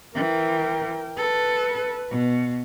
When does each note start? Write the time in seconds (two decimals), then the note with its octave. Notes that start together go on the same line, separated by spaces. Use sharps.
0.15 E3 A#4 G5
1.18 A4 B4
2.11 B2